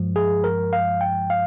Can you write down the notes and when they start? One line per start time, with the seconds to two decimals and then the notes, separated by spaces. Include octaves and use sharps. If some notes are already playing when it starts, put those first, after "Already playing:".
Already playing: G2 F3 G#3
0.16 G#4
0.44 A#4
0.73 F5
1.01 G5
1.30 F5